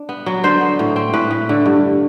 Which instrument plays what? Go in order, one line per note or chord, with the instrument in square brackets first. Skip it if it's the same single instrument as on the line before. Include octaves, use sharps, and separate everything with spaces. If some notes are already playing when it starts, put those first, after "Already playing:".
Already playing: [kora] D4
B3
F#3
D3 C5
B3
A2
C4
A2 B4
A2
D3
G2